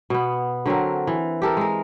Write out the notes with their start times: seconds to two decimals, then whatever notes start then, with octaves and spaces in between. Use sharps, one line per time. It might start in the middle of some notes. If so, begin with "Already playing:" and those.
0.10 B2 B3
0.66 D3 F#3 C4 A#4
1.07 E3
1.42 G4 A4 A#4
1.57 G#3 A#4